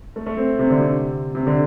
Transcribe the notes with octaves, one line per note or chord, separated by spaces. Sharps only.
A3
A3
C4
C3
D3
C3
C3
D3